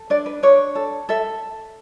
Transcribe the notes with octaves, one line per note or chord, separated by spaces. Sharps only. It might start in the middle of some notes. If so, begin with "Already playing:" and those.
Already playing: A4
D4 D5
B4
D4 C#5
A4
A4 E5